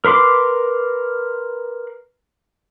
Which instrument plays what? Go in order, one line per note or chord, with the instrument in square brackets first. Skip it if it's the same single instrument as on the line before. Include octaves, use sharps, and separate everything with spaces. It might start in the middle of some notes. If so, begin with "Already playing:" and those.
[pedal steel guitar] A#4 B4 C6 D6